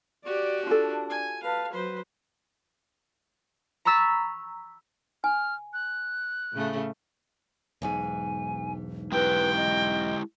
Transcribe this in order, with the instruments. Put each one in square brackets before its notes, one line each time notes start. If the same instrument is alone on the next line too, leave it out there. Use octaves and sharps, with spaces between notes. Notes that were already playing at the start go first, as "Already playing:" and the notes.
[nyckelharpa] F#4 G4 [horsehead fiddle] D5
[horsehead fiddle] D4 [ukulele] F4 A4
[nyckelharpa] G#5
[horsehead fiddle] B4 A5 [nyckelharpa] F5
[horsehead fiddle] F#3 B4 [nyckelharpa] C5
[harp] A#5 B5 C#6 E6 A6 B6
[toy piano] G#5 [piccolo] F6
[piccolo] F#6
[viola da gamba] A2 C#3 A3
[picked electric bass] E1 B1 G#2 [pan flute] G#5
[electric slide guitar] G#3 E4 G4 [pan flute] B4 [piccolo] G5
[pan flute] D#5